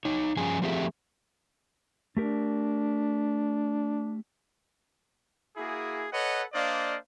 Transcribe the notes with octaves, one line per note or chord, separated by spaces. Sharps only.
D#4 C#5
G2 F3 C#4 G#4 G#5
F3 A3 C4 G4 G#4 E5
A3 D4 G4 A#4
A#3 E4 F#4 G#4
A4 B4 C#5 D#5 F#5
A#3 D4 C5 D5 D#5 F5